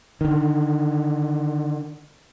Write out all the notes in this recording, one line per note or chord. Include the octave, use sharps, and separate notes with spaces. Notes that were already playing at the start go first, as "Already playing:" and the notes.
D3 D#3